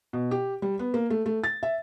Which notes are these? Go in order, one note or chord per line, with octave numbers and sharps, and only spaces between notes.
B2
G4
G3
B3
A#3
A3
A3
A6
E5